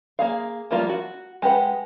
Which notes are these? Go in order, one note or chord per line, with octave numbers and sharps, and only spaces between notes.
A#3 G#4 F5
F3 G3 A3 A#3 F4
F#4
G#3 G4 B4 F#5